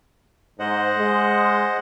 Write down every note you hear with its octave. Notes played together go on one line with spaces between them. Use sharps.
G#2 C5 D#5 F#5
G#3